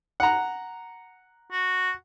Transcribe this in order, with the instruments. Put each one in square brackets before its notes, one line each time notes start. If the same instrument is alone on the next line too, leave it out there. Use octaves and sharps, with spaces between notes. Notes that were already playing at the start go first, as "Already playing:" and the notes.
[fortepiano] F#5 A#5
[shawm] F#4